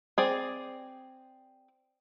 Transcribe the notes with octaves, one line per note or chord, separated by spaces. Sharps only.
C4 G#4 D5